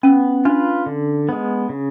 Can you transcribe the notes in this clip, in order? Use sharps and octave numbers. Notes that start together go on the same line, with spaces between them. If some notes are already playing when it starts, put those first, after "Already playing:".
B3 C#4
D4 F4 B4
D3
G#3 B3
C#3